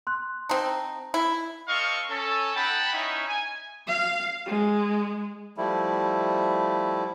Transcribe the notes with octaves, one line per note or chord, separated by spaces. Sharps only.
C6 F#6
C4 D#4 A5
E4
C4 A4 D#5 F5 C6 C#6
C#4 A4
D#4 F#5 G5 A5 B5
C#4 D#4 E4
G#5
F5
G#3
F3 G3 A3 E4